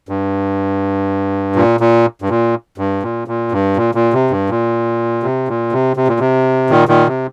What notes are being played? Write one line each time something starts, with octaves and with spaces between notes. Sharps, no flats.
G2
A#2
A#2
G2
A#2
G2
A#2
A#2
G2
A#2
A#2
C3
G2
A#2
C3
A#2
C3
C3
A#2
C3
A#2 D#3
A#2 D#3
C3